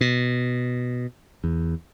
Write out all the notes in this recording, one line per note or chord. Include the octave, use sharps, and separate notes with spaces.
B2
E2